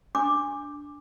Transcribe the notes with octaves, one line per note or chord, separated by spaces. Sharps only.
D4 D6